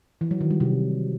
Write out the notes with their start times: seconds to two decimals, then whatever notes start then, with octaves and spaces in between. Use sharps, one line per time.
0.21 E3
0.31 F#3
0.41 D#3
0.51 G3
0.60 C3